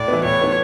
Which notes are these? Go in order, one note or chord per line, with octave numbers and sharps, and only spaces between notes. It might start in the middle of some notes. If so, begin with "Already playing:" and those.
Already playing: A2 D5
E3 B3
A2 C#5
E3 B3